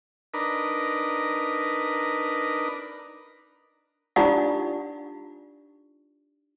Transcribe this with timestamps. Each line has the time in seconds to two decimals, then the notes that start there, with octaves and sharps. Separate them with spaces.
0.34 D4 D#4 A#4 B4
4.16 D4 D#4 F4 G4 D5 F#5